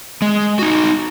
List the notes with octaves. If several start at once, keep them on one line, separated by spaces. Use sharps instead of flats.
G#3
D#4 F#4